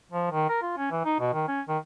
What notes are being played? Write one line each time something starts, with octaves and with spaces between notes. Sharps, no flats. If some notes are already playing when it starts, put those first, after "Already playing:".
F3
D#3
A#4
F4
C#4
E3
D#4
B2
D#3
C#4
D#3